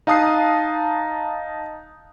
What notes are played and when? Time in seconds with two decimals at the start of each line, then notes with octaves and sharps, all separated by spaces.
0.07 D#4 F5 A5 D#6 F#6 C7